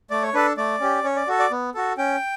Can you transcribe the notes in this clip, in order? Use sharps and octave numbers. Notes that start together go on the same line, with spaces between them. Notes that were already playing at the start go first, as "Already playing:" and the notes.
A3 D5
C#5
D4 A4 B4
A3 D5
C#4 G4
C#4 C#5
D5
F#4 A4
D5
B3
F#4 A4
C#4 G5